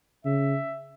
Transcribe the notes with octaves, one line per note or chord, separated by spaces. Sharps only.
C#3 E5